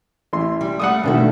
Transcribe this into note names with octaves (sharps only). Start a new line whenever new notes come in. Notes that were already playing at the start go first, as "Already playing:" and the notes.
A1 E3 C6
G3
G3 A3 F#5 D#6
E2 G2 B2 D3 D#3 A3